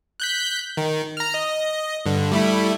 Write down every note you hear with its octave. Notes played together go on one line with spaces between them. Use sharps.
F#6 G6 B6
D#3
A#5 F6
D#5
G2 D3
G3 A3 E4